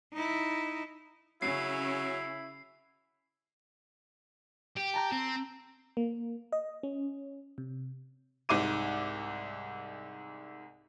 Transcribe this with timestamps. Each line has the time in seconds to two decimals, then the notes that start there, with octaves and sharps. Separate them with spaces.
0.13 D#4 E4
1.42 C#3 F#3 C#4 E4 C7
4.77 G4
4.94 A5 A#5 G6
5.12 C4
5.97 A#3
6.52 D#5
6.83 C#4
7.58 C3
8.49 C2 G#2 D6 D#7